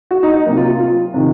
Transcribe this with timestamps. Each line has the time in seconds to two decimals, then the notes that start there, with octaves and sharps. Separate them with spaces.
0.11 F#4
0.23 D#4
0.34 D#4
0.46 C3 F#3 A#3
0.57 F4
0.68 F4
0.80 F4
1.14 C3 D#3